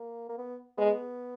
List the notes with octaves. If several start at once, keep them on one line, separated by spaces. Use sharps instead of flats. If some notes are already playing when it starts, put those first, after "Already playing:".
Already playing: A#3
A#3
B3
G#3 B3